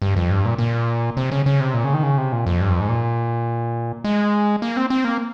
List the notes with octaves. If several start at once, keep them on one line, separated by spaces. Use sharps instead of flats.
G2
F2
G2
A#2
A#2
C3
C#3
C#3
C3
A#2
C#3
D#3
C#3
C3
A#2
F2
G2
F2
G#2
A#2
G#3
A#3
C4
C4
A#3